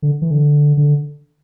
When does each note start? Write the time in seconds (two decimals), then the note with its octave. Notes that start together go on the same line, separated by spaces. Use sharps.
0.02 D3
0.22 E3
0.31 D3
0.77 D3